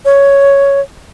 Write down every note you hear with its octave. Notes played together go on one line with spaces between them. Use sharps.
C#5